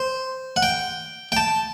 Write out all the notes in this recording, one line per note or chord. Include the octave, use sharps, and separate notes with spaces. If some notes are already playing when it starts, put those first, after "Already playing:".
Already playing: C5
F#5
G5
G5
A5